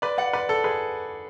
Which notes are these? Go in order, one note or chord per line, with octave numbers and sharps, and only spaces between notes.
B4 D5
D5 F#5
B4 D5
A4
G#4 B4